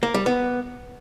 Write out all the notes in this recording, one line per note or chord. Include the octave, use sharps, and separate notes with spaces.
A#3
G3
B3